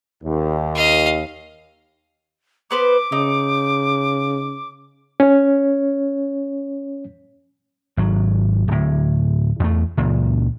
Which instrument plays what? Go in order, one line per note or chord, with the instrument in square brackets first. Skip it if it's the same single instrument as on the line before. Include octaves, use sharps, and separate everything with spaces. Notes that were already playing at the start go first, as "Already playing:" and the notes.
[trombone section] D#2
[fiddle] D#5 F5
[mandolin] B3 B4 C5 [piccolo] D6
[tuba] C#3 [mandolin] D#4
[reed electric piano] C#4 C#5
[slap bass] G#1 F#3
D1 A2
E2 A3
C#2 A#2 E3